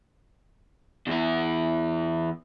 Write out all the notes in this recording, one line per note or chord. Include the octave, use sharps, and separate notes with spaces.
E2 E4